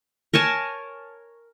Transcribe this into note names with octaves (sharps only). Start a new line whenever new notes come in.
A#4 C#5 G#5 A5